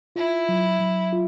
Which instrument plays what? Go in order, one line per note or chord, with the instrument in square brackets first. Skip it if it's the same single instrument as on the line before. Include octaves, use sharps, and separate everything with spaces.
[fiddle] E4 [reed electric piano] F4
[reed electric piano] F#3
F#3
F4